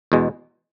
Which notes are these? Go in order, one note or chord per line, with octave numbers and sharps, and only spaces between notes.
E2 B2 G#3